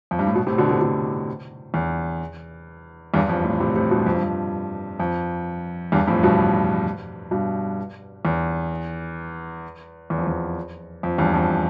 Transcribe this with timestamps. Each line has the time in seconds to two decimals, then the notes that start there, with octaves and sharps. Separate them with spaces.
0.11 F2
0.19 G2
0.27 A2
0.35 G2 B2
0.47 A2 C3
0.58 B2 D3
0.70 A2 C3
0.81 B2 D3
1.74 E2
3.14 E2 G2
3.29 F2
3.44 F2 A2
3.60 A2 C3
3.75 A2 C3
3.91 G2 B2
4.06 F2
4.15 G2
4.24 F2
5.00 F2
5.92 E2 G2
6.07 F2 A2
6.23 G2 B2
7.31 G2 B2
8.25 E2
10.10 E2
10.18 F2
10.27 E2
11.03 F2
11.18 E2 G2
11.34 F2